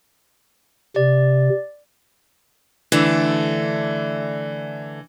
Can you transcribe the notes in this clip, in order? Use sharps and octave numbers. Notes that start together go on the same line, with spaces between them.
C3 D5
D3 E3 A3 D4